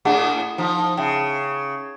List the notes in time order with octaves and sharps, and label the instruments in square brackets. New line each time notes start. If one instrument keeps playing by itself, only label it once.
[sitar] A2 D4 [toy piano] G#4 D#5 F#5
[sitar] F3 D#4 [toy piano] E4 G#5
[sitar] C#3 [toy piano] E5 G5